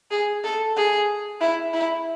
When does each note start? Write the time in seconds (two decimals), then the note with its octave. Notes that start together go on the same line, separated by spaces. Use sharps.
0.11 G#4
0.44 A4
0.76 G#4
1.41 E4
1.74 E4